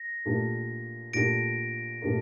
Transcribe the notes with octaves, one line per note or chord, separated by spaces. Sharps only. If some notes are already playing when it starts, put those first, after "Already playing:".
Already playing: A#6
A#2 A3 D4 G4 A#4
A#2 A3 D4 G4 A#4 A#6 D7
A#2 A3 D4 G4 A#4